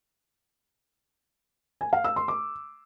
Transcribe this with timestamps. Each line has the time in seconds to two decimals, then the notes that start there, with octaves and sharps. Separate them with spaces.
1.81 G#5
1.93 F5
2.05 E6
2.16 C6
2.28 D6